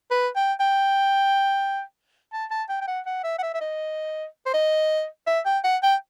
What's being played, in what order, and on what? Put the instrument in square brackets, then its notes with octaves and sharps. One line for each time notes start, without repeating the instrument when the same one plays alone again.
[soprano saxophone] B4
G5
G5
A5
A5
G5
G5
F#5
F#5
E5
F#5
E5
E5
D#5
C5
D#5
E5
G5
F#5
G5